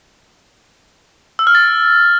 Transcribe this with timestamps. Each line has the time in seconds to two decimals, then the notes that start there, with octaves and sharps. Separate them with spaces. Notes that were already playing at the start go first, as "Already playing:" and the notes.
1.39 E6
1.47 F6
1.55 A6